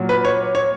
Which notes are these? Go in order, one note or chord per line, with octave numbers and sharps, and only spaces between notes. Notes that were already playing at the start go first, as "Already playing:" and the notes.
Already playing: A#2 F#3
B4
C#5
C#5